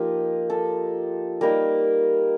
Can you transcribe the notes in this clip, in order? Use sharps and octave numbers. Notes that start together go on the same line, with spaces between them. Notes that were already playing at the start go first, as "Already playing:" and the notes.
Already playing: F3 A#3 D#4 G4
A4
G3 A#3 D#4 A#4